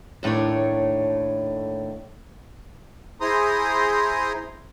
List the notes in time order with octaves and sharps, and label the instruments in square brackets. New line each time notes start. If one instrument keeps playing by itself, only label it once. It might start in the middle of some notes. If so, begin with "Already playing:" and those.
[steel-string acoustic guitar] D#2 A2 A3 D4 C#5
[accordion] E4 G#4 C5 A#5 C6 D#6